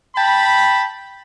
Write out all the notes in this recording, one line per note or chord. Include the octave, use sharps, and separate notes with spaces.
G5 A5 B5